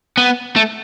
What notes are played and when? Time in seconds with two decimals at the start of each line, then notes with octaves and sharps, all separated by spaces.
0.17 B3
0.56 A3